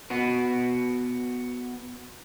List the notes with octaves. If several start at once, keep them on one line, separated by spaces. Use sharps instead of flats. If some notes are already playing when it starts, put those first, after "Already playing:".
B3 F#4 B4